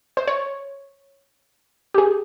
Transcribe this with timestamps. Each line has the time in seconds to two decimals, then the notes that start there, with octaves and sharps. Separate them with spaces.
0.17 C5
0.27 C#5
1.94 G4
1.98 G#4